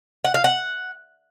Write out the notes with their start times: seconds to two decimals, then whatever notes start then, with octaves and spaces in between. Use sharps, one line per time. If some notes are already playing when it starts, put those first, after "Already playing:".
0.24 F#5
0.34 F5
0.44 F#5